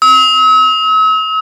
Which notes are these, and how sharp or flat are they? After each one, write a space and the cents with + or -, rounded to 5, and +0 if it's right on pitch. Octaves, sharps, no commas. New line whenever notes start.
E6 -45